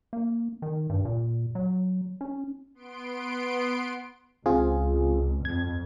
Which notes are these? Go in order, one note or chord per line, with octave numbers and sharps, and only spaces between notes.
A#3
D#3
G2
A#2
F#3
C#4
B3 C6 D7
C#2 C4 F4 G#4
F2 G#6